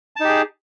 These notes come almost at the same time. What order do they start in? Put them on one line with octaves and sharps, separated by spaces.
A5 D#4 G4 G#4